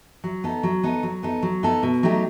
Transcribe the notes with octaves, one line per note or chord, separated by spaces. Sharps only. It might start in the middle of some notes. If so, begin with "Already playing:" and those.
F#3
B3 D#4 A4
F#3
B3 D#4 A4
F#3
B3 D#4 A4
F#3
B3 D#4 A4
B2
F#3 A3 D#4 G4